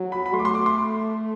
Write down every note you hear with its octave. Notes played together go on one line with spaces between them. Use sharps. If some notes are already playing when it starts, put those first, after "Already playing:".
Already playing: F#3
B5
B5
A3 C6
D6
C6
D6
C6